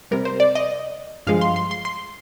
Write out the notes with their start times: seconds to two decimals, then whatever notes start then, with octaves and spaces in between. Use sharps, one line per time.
0.11 C3 G3 A#4
0.25 C5
0.40 D5
0.55 D#5
1.27 G2 F3 G#3 F5
1.41 C6
1.56 C6
1.71 C6
1.85 C6